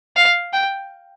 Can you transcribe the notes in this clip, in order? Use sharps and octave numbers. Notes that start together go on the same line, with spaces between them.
F5
G5